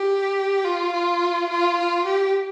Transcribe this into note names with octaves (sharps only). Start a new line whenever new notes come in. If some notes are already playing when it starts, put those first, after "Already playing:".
Already playing: G4
F4
F4
F4
F4
G4